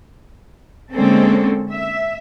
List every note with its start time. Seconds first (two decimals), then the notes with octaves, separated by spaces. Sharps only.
0.93 D3 G#3 A#3 C4 C#4 A4
1.71 E5